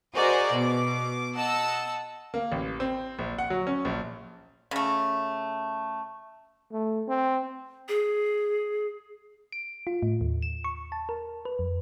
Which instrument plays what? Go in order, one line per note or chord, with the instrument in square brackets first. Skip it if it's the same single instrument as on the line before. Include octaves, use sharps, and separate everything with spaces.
[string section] F#4 G#4 A#4 C5 D5 D#5
B2 D6
D#5 F#5 A5 E6
[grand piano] A#3
A1
C4
A#1
F#5
F#3
C#4
A#1
[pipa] C#3 A3
[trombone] A3
C4
[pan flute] G#4
[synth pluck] D7
F4
A2
D#2
E7
C#6
A5
A#4
B4
F2